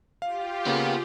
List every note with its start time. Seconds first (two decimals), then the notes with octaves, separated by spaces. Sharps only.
0.22 F4 G4 F5
0.66 C#3 A#3 B3 F5